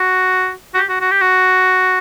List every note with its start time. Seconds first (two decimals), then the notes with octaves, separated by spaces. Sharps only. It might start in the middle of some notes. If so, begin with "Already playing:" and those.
Already playing: F#4
0.74 F#4
0.78 G4
0.89 F#4
1.01 F#4
1.11 G4
1.21 F#4